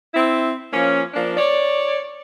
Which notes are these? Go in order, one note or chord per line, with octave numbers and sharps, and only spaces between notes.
C4 E4
F3 A#3 C#4
F3 A#3 D4
C#5 D5